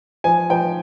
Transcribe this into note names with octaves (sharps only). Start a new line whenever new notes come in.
F3 G#5
F3 G5